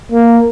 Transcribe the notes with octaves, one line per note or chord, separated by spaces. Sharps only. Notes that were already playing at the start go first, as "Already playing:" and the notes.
A#3